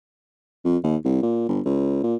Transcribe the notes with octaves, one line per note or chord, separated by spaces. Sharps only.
F2
D#2
C2
A#2
G1
C#2
A#2